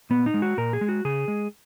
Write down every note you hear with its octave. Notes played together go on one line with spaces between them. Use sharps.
A#2 B3
D#4
G#3
F#4
A#2 A#4
G#4
G#3
F#4
C#3 G#4
G#3